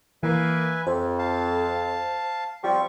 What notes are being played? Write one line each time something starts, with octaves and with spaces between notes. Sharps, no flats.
E3 A#3 B4 E5 G#5
F2 C5
F5 A5
F3 G3 C4 C#6